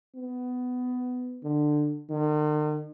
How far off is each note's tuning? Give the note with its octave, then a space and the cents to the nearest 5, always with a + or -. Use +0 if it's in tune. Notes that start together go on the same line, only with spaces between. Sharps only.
B3 +15
D3 +20
D#3 -45